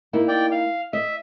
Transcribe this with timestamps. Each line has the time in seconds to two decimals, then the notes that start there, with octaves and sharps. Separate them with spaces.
0.13 A#3 D#4 E4
0.28 D5 G5
0.52 F5
0.93 D#5 E5